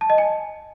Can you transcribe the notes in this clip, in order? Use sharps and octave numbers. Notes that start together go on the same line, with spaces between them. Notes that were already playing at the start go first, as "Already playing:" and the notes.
A5
D#5
G#5